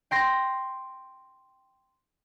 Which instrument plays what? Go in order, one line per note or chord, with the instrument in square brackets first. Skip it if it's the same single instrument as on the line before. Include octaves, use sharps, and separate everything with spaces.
[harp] G5 C6 A#6